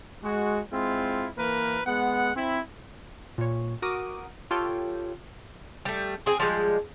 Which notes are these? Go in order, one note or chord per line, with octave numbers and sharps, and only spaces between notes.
G#3 F#4
G#3 C4 E4 F4
E3 A#3 A#4 B4
G#3 B3 F#5
C4 E4
A#2 C#5
F#4 A#4 D6 D#6
F4 G4 A4 C#5 G5
G3 A3
C4 G#4
F3 G3 G#3